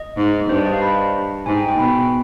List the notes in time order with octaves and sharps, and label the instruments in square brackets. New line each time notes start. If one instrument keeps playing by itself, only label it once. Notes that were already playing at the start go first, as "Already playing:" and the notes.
Already playing: [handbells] D#5
[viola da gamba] G#2
[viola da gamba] G2 [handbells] C5
[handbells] D5
D#5
F5
B5
[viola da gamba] G#2 [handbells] G#5
[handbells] G5
G5
[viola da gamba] B2 [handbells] B5